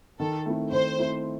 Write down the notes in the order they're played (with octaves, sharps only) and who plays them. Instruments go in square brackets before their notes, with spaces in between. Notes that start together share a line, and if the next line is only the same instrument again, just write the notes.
[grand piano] D#3 [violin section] A4
[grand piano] A3 C4 E4
[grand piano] D#3 [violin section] C5
[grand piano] A3 C4 E4